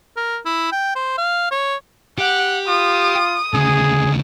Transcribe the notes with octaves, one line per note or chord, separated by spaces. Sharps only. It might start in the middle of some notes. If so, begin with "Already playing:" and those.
A#4
E4
G5
C5
F5
C#5
G4 F#5
F4 D#6
D2 C#3 G#4